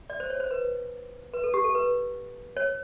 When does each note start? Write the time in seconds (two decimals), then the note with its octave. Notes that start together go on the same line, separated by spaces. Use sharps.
0.10 D5
0.20 C5
0.30 C#5
0.40 C5
0.51 B4
1.34 B4
1.44 A4
1.54 G4
1.64 A4
1.75 B4
2.57 C#5